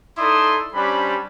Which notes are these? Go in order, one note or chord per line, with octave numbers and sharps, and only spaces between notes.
D#4 E4 A4 D5 C6 D#6
G3 C#4 D4 C5 B5